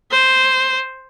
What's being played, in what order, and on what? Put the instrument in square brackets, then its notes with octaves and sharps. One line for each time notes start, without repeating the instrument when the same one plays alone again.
[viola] C5